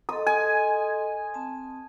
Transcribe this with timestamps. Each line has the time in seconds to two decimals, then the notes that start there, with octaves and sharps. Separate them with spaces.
0.09 A4 D#5 C6 D#6
0.27 G#5
1.34 C4 A5